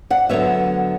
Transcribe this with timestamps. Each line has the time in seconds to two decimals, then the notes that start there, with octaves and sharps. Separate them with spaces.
0.10 D5 F#5
0.29 D3 F#3 B3 C#5 E5